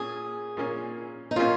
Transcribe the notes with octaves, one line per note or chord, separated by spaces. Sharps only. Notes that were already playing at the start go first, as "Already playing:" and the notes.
Already playing: A#2 A#3 C#4 G#4
A#2 A#3 C#4
D#4
A#2 A#3 C#4 F4